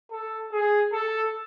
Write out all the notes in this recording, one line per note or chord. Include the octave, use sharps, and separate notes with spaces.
A4
G#4
A4